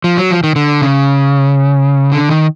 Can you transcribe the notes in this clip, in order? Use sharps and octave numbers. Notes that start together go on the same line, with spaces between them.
F3
F#3
F3
D#3
D3
C#3
D3
D#3